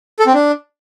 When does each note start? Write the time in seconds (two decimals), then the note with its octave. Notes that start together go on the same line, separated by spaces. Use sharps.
0.19 A4
0.27 C4
0.34 D4